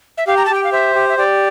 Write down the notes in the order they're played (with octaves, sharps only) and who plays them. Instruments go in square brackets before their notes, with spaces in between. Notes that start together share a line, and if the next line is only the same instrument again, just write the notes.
[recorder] E5
[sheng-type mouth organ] G4 [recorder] F5
[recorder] A#5
A5
[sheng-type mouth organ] G4 [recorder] G5
[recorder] F5
[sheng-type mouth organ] C5 [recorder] E5
[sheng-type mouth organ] G4
[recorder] E5
[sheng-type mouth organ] G4 [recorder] D5